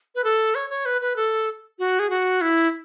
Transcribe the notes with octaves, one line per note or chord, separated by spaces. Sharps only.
B4
A4
C#5
C#5
B4
B4
A4
F#4
G#4
F#4
E4